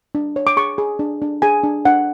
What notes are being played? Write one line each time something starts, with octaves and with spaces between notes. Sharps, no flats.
D4
C#5
D6
G#4 C#6
G#4
D4
D4
G#4 G#5
D4
D4 F#5